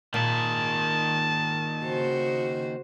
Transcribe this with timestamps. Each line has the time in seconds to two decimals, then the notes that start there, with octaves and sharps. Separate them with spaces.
0.14 A#2 D#3 G#4 A5
1.85 C#3 F#4 C5